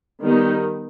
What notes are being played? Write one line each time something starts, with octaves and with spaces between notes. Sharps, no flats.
D#3 G3 B3 D#4